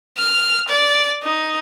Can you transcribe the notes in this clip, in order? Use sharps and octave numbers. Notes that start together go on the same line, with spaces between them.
F6
D5
D#4